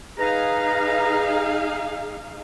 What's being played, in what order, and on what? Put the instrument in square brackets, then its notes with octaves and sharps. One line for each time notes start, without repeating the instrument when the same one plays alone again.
[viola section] D#4 G#4 F5 [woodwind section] B4 A#5